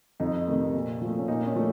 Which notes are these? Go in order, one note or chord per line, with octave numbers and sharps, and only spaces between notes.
F2 D#4
C3 D#3 A3
A#2
F3 A3
C#4
A#2 D#4
C#4
F3 A3